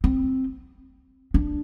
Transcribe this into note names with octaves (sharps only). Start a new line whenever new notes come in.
C4
D4